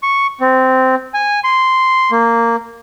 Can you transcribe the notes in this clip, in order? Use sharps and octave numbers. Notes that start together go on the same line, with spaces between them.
C#6
C4
G#5
C6
A#3